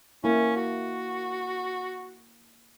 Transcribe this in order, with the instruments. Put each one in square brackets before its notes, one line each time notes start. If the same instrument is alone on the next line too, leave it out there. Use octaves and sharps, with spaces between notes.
[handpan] A#3 E4 [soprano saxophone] C#4
[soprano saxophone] F#4